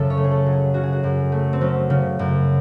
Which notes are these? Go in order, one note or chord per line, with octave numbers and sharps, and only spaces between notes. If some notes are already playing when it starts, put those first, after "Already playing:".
Already playing: F#2 C#3 F#3 A4 E5
C#5
A3
G#4
A4
F#3
G#4
C#3 F#4
G#4
F#4
F#2
A3
C4
F#3 C#4
C#3
F#2